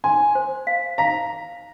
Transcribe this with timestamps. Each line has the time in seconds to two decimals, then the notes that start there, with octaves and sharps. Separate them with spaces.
0.04 G#5 C6
0.35 C5
0.67 F5
0.98 F5 A#5